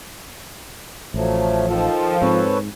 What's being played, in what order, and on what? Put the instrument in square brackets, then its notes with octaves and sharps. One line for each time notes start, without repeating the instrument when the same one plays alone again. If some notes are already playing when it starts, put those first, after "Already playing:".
[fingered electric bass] A1 [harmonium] F3 F#3 A3
[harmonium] D#3 A4 [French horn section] F3
[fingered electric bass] G#2 [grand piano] C4 [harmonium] A4 B4 C#5